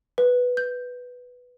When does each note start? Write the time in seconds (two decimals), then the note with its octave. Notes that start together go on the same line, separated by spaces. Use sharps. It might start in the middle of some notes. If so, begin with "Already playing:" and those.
0.18 B4
0.57 G6